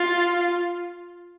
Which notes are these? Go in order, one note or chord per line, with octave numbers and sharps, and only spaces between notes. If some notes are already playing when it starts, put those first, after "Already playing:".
Already playing: F4